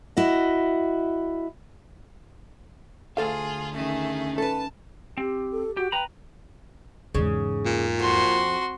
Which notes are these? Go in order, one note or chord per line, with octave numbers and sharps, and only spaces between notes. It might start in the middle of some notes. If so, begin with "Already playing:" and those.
E4 F#4 D#5
D2 F4 G#4 A4 F5
D#3 A3 C#4 G#4
A4 B4 A5
C4 G4
A4
F#4 G4
B4 G5 A#5 B5
E2 G#2 C#3
A#2
F2 F#4 C6